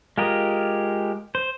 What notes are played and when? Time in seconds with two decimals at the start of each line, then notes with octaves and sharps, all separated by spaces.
0.18 G#3 F4 G4 A#4 D#5
1.35 C5